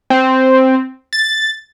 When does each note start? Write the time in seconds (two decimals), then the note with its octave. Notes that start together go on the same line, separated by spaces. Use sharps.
0.10 C4
1.13 A6